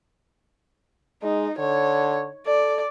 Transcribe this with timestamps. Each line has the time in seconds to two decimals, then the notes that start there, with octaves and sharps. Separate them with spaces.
1.23 G#3 D#4
1.59 D3 C#5
2.46 A4 D5